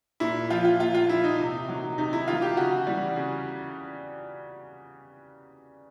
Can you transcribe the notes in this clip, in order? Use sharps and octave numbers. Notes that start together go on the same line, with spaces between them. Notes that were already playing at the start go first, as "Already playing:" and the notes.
A#2 E4
F3 F4
F4
A#2 F4
F4
F3 E4
D#4
C3
D#3 F#3
C3 D#4
E4
D#3 F#3 F4
G4
C#3 F#4
E3 G3
C#3